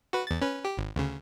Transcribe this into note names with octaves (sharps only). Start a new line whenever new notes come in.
F#4 B4
E2 A6
C#4 B4
G4
G#1
D2 C#3